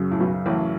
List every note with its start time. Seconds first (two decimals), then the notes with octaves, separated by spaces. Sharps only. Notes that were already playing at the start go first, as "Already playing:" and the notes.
Already playing: F#2 C#3 F#3
0.11 A2
0.20 B1 B2
0.46 A1 A2